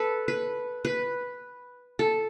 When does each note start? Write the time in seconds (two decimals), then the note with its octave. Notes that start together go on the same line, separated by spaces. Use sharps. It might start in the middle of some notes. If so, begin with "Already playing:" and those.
Already playing: A4 B4
0.28 B4
0.85 B4
1.99 A4